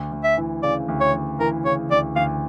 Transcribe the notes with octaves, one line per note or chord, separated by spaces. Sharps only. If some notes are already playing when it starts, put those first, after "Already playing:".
Already playing: D2
D2
E5
E3
C#3 D5
D2
C#5
D2
E3 A#4
C#3 C#5
D2 D5
D2 F5